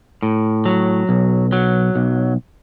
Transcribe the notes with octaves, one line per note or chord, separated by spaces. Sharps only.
A2
F#3
B1
F#3
B1